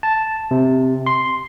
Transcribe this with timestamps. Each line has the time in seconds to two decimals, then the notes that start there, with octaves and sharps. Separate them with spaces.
0.03 A5
0.51 C3
1.06 C6